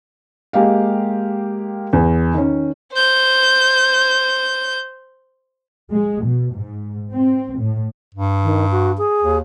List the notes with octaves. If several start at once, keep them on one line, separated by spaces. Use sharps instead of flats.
G#3 A#3 G4 F5
E2
D#3 C#4
C5 G6
G#3
B2
G#2
C4
A2
G2
D#3
F#4
G#4
D#2